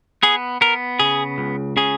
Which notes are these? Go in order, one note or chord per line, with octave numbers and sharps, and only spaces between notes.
B3 G#4
B3 A#4
C#3 G#4
C#2
C#3 G#4